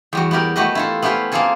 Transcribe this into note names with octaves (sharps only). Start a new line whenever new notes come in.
E2 G3 F#4
B3 E4 G4 A#4
A3 F#4 G4 B4 D#5
E4 F4 A4
B3 C#4 E4 G4 B4 C5
A#3 C4 F4 G#4 A4 G#5